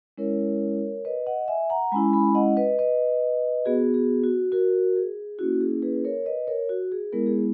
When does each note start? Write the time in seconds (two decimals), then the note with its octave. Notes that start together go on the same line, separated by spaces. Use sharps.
0.18 G#3 C#4 E4 A#4 C#5
1.05 B4 D#5
1.26 D#5 F#5
1.48 E5 G#5
1.70 F#5 A#5
1.92 G#3 C#4 E4 G#5 B5
2.13 G#5 B5
2.35 D#5 F#5
2.57 B4 D#5
2.79 B4 D#5
3.65 B3 F#4 G#4
3.94 G#4
4.24 F#4
4.52 F#4 A#4
4.96 G#4
5.39 A#3 C#4 E4 F#4
5.61 G#4
5.82 G#4 B4
6.05 A#4 C#5
6.26 B4 D#5
6.47 A#4 C#5
6.69 F#4
6.92 G#4
7.13 G#3 B3 E4 A#4
7.26 G#4